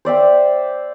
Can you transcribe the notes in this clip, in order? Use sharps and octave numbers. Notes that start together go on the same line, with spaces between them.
C5 D5 E5 G5